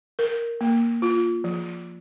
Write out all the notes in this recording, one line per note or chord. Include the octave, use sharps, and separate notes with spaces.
A#4
A#3
F4
F3